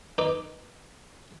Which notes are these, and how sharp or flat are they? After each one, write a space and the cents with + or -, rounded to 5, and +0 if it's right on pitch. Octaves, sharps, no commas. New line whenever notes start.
D#4 +0 B4 +0 D6 +0